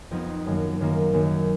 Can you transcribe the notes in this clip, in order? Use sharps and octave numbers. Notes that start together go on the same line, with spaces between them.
F2 F3 B3 D#4
F#2 D#3 A#3
F#2 D#3 A#3
F#2 D#3 A#3